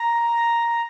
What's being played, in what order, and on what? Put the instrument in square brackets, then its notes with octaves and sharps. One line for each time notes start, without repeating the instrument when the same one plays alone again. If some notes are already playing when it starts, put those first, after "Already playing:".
Already playing: [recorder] A#5